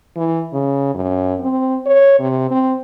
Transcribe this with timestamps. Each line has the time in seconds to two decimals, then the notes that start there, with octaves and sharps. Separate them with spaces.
0.16 E3
0.53 C#3
0.95 F#2
1.40 C4
1.86 C#5
2.19 C3
2.51 C4